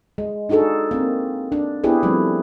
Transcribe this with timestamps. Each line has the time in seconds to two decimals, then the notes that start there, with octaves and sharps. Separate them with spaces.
0.18 G#3
0.49 D4 D#4 F#4 G#4 A4
0.91 A#3 C4
1.52 D4
1.84 B3 D4 E4 G4 G#4 B4
2.03 F3 G3 A3 C4